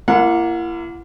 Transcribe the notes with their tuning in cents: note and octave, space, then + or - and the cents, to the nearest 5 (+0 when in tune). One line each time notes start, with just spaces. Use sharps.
A#3 +0 E4 +40 F#5 -25